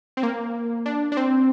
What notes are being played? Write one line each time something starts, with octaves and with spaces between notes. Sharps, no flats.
C4
A#3
D4
D4
C4